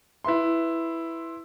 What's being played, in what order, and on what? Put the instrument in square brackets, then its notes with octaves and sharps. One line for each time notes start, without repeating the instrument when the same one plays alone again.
[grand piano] E4 B4 E5 C6